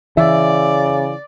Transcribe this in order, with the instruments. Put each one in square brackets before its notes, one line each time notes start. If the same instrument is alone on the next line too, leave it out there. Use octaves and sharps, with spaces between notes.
[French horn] C#3 [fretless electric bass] E3 [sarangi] D5 [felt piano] E5